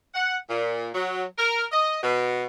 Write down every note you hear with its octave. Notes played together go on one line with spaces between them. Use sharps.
F#5
A#2
F#3
A#4
D#5
B2